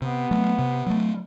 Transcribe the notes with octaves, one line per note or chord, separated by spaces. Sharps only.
C3 B3
F#3 A3
C3
F#3 A3